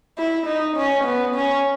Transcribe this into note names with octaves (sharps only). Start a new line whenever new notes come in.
E4
D#4
C#4
B3
C#4